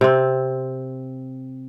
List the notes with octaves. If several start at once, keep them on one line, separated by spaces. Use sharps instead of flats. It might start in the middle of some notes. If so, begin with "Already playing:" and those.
C3 C4